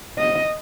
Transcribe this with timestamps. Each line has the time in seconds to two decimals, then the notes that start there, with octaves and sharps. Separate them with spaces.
0.18 D#5